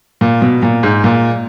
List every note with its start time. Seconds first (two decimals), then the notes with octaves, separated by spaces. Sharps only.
0.21 A#2
0.42 B2
0.62 A#2
0.83 G#2
1.04 A#2